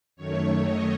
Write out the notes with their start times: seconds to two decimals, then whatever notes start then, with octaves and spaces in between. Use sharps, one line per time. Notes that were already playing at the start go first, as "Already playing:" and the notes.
0.16 F#2 D#3 A3 C#5
0.63 D#5